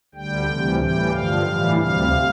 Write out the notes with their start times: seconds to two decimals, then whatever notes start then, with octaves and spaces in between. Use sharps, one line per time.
0.15 D2 D3 G3 G5
0.46 D2 C3 E3 G3
0.78 A2 E3 G3 G5
1.11 G2 D3 F3 F5
1.43 A2 E3 G3
1.76 D2 C3 G3 F5